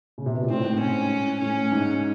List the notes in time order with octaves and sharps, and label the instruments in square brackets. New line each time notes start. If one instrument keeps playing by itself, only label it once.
[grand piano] C#3
C3
B2
A#2
[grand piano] A2 [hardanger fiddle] C4
[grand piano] G#2
[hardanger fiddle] C#4
[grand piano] A2 [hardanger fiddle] C#4
[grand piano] G#2